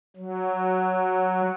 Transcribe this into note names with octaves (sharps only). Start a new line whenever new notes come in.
F#3